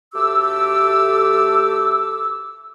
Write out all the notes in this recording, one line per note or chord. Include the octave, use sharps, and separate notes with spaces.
D2 A3 G4 D6 E6